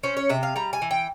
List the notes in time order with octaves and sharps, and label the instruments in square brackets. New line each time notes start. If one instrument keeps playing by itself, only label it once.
[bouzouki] C#4 C5
C#5
C3 E5
F5
G3 A#5
G#5
E3
G5